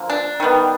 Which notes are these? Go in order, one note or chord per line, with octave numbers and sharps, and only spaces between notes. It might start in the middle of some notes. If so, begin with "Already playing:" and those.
Already playing: D3 F3 A#3
D4
D#3 G3 B3